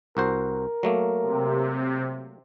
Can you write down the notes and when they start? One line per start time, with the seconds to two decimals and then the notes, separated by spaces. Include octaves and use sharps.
0.17 C2 F#4 A#4 C5
0.83 F#3 A3 A#3
1.23 C3